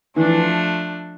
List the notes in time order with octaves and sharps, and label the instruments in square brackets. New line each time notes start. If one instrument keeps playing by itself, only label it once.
[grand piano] E3 [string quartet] F3 A3 D4